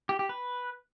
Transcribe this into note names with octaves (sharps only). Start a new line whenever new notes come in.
G4
G4
B4